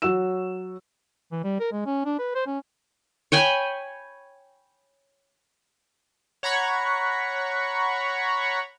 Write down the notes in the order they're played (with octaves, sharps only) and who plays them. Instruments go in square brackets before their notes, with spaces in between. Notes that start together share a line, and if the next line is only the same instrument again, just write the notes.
[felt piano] F#3 F#4 C#5 E6 E7
[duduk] E3
G3
A#4
G#3
C#4
D4
B4
C5
C#4
[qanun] C#5 G5 G#5 B5
[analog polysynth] C#5 F#5 A#5 B5 C#6